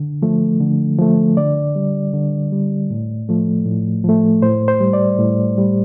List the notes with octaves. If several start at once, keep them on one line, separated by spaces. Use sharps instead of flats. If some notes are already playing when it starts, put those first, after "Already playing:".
Already playing: D3
F3 A3
D3
F3 A3
D3 D5
G3
D3
G3
A2
F3 A3
A2
F3 A3
A2 C5
C5
G3
D5
A2
G3